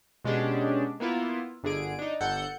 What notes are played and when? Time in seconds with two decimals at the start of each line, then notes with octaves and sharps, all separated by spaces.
0.24 B2 G#3 C#4 D4 G4 G#4
1.00 A#3 B3 E4 F4
1.63 G1 D3 G#4 D7
1.99 D4 D#4
2.21 G1 A4 F#5 G6 C#7